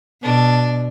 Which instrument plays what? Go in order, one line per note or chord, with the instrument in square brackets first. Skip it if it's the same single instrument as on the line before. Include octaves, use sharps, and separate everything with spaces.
[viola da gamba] B2 [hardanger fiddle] D4